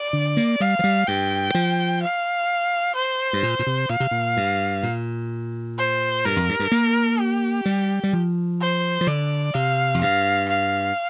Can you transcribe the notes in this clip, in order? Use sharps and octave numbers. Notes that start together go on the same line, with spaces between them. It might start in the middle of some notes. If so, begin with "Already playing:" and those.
Already playing: D5
D3
A#3
G3 F5
F3
G3
G2 G5
F3
F5
C5
G2
A#2
A#2
C3
A#2 F5
C3
A#2
G2
A#2
C5
G2 A#4
F2
G2
G2
A#3
G4
G3
G3
F3
C5
F3
D3 D5
C3 F5
F2
G2 F5
F5